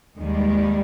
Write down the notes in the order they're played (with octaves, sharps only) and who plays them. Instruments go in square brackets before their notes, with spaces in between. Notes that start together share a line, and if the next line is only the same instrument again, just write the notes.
[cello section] D#2 D#3 G3 G#3